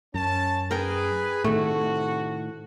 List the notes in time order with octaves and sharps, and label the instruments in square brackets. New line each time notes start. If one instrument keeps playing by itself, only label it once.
[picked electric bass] F#2 [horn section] C#4 A5
[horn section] G#4 B4 [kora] A#4 G5
[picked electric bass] A2 D#3 [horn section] C3 F#4 [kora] A3